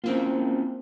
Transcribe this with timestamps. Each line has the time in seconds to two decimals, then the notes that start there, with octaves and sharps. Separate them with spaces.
0.04 A#3 C4 C#4 E4 F4